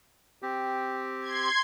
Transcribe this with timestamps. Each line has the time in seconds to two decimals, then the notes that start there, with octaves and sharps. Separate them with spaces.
0.42 C4 G4
1.21 C6 G#6